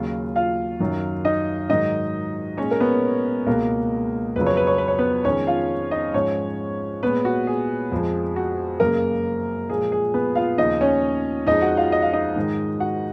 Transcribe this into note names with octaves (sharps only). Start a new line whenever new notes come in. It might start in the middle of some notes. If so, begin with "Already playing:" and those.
Already playing: D#2 C#3 F#3 F4
F4 F5
F#2 D#3 F#3
D#4 D#5
G#2 D#3 F#3 D#4 D#5
A#2 G#3 C#4 C#5
A#4
B3 B4
C#2 B2 G#3 A#3 A#4
F2 C#3 F#3 B4
C#5
B4
C#5
B4
C#5
B3 B4
F2 D#3 G#3 C#4 C#5
F4 F5
D#4 D#5
G#2 F3 G#3 C#4 C#5
A#2 G#3 B3 B4
F#4
G#4
F2 F3 G#3
F#4
F#2 C#3 G#3 A#3 A#4
A#2 F3 G#3 G#4
G#4
B3 B4
F4 F5
D#2 C#3 F3 D#4 D#5
C#4 C#5
F2 F3 G#3 D#4 D#5
F#4 F#5
F4 F5
D#5
F5
D#4 D#5
G#2 D#3 G#3
F#4 F#5